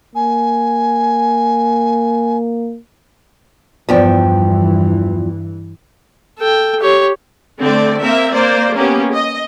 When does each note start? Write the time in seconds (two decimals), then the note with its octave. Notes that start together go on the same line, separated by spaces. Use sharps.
0.15 A#3 G#5
3.89 E2 G2 E3 F3 G5
6.39 A4 G5
6.80 G4 C#5
7.61 D3 A3 C4 D5
8.01 A#3 C4 A#4 E5
8.33 A#3 C5 D5
8.76 A#3 B3 C#4 G4
9.11 D#5